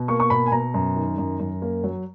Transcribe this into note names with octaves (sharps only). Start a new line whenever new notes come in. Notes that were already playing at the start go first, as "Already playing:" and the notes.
Already playing: B2
A#3 C#6
C#6
B2 B5
G#5
B2 A#5
F#2
D#3
F#2
F#2
A#3
F#3